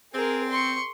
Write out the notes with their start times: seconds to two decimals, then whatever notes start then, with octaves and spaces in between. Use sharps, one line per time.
0.13 C4 G#4 A#4
0.50 C6 C#6